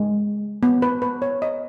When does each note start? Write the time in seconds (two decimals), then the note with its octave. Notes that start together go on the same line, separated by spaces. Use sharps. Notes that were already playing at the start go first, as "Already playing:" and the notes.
Already playing: G#3
0.63 B3
0.82 B4
1.02 B4
1.22 C#5
1.42 D#5